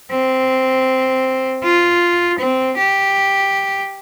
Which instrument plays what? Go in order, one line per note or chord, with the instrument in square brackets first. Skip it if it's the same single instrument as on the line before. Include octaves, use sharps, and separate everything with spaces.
[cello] C4
F4
C4
G4